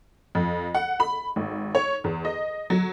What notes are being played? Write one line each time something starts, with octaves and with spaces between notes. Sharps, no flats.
F2
F#5
B5
G#1
C#5
E2
D#5
F#3